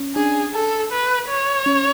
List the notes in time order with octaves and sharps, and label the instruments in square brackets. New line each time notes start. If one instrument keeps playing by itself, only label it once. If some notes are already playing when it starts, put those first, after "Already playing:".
Already playing: [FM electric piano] C#4
[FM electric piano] D4 [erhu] G#4
[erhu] A4
B4
C#5
[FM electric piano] C#4